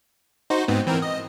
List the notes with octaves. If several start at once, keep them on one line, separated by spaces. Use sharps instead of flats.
D#4 F#4 C5
G#2 B3 C4
E3 C4 A#4
D#5